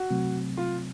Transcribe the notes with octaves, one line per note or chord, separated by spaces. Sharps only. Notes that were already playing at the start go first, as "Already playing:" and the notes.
Already playing: F#4
C3 F#3 A3 C4
F4